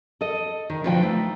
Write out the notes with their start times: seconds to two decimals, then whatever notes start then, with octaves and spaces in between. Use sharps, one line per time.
0.21 A4 D#5
0.70 D#3
0.84 B2 D3 F3 D4 G5
1.03 A3 D#4